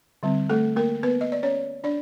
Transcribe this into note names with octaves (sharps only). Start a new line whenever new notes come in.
D3 G3 C4
A3 A4
A#3 A#4
B3 B4
D#5
D5
C#4 C#5
D4 D5